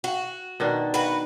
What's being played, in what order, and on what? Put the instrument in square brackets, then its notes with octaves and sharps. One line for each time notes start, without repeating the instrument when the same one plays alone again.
[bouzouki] F#4
[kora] B2 D#3 D4
[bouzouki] F#4 B4